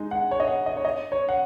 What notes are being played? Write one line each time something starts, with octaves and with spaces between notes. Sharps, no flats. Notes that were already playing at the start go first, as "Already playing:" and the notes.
Already playing: G#3 D#4
F#5
C#5
D#5
F#5
D#5
C#5
D#5
C#5
F#5